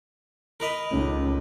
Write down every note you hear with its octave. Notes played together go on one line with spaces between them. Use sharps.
A#4 B4 D#5
C#2 A3 C#4 D#4